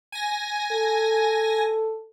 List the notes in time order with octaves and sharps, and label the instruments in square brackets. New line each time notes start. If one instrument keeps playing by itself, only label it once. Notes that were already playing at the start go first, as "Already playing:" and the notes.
[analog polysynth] G#5 A#6
[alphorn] A4